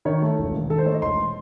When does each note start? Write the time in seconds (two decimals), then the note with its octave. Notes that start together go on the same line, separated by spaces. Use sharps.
0.05 D#3 C#5
0.22 A3
0.38 E1
0.54 D#2
0.70 D#3 A4
0.78 C5
0.86 A3 C#5
0.94 D#5
1.02 E1 C6